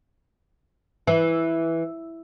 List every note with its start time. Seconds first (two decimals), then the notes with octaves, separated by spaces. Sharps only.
1.07 E3